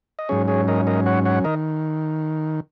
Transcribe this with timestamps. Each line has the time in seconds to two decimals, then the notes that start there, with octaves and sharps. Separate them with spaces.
0.19 D#5
0.29 G#2 F#3 C#4 G#4 C#5
0.48 G#4 C#5
0.68 A#4 D#5
0.87 A#4 D#5
1.06 C#5 F#5
1.25 C#5 F#5
1.44 D#3 A#4 D#5